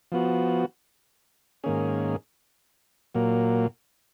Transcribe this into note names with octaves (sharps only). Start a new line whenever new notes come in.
F3 B3 F#4
G#2 D#3 A#3 C#4 G#4
A#2 F#3 A#3